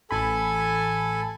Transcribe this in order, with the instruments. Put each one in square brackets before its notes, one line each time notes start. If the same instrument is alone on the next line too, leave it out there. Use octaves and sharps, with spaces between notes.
[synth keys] A1 B5 [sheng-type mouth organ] A4 G#5